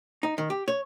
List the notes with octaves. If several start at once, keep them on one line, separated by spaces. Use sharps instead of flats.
D#4
D#3
G4
C#5